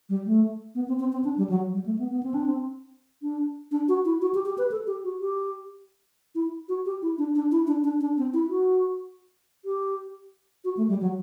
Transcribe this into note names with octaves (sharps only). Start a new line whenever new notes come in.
G3
A3
B3
C4
C4
C4
D4
G3
F#3
G3
A3
B3
B3
C4
D4
C4
D4
D4
F#4
E4
F#4
G4
G4
B4
A4
G4
F#4
G4
E4
F#4
G4
E4
D4
D4
E4
D4
D4
D4
C4
E4
F#4
G4
F#4
A3
G3
F#3